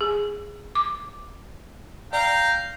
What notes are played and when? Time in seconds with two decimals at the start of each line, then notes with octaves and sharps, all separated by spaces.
0.01 G#4
0.75 D6
2.13 D5 F5 G5 A#5